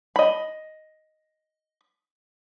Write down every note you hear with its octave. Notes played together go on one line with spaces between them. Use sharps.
D#5 B5